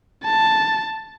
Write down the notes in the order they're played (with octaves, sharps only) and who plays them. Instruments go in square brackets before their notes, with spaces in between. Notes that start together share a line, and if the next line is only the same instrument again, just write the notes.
[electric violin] A5